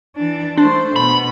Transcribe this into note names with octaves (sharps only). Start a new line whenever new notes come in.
E3 D4
A3 D4 C5
B2 B3 B5